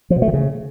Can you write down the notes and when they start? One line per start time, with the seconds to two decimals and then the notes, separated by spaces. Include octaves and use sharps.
0.10 F3
0.16 B2
0.22 A3
0.28 D#3
0.34 C#3